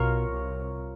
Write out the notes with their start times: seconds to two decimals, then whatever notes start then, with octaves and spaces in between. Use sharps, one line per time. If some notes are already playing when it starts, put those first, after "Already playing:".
Already playing: B1 B2 F4 A#4 C#5
0.31 C2 C3